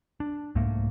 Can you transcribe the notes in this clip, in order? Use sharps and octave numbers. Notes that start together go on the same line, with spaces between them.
D4
C2 G#2 A3 A#3